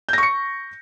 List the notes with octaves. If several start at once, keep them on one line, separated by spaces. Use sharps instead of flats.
C#6 G6 A#6 C#7